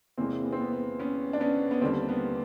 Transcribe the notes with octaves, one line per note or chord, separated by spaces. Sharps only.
E2 C3 E3 G#3 A#3 C4
B3
C4
B3
B3
B3 C#4
D4
B3 C#4
B3
D#2 D3 G3 A#3 C4
B3